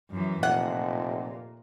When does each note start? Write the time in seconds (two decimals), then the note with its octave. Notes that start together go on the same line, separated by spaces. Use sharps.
0.10 F#2 E3
0.43 F1 A#2 F#5